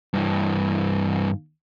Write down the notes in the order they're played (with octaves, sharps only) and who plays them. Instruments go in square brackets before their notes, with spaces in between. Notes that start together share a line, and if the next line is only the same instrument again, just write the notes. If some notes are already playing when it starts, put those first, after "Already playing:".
[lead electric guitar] G2 E3